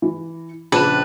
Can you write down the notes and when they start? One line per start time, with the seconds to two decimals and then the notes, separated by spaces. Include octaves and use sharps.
0.02 E3
0.72 A#1 C#3 D4 B4 E7